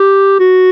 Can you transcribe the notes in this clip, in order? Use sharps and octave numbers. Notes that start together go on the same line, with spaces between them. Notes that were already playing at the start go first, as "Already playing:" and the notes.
Already playing: G4
F#4